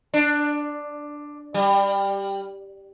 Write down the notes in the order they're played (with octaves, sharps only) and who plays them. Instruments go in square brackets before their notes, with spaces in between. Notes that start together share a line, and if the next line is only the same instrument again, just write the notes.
[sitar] D4
G3